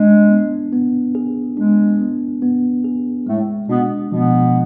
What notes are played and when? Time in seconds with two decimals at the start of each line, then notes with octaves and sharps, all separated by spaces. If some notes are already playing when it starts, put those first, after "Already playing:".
Already playing: G#3 D4
0.29 B3
0.73 B3
1.15 G#4
1.57 G#3 D4
2.00 B3
2.42 B3
2.84 G#4
3.27 A2 G#3 A3
3.69 B2 B3 D4
4.12 B2 F3 B3